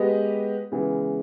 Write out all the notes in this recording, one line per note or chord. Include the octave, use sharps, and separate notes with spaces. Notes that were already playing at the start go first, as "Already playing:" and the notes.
Already playing: G#3 B3 G4 B4 D#5
C#3 E3 G#3 B3